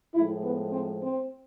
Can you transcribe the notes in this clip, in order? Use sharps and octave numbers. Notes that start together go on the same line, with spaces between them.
A2 F3 G#3 E4
B3
C4
C4